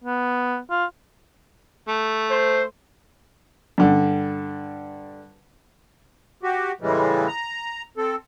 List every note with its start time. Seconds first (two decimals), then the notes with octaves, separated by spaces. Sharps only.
0.04 B3
0.70 F4
1.88 A3
2.30 C5
3.78 G2 D3
6.43 F#4 G4
6.81 A2 C#3 E3 G3 G#3
7.28 A#5
7.97 C4 A4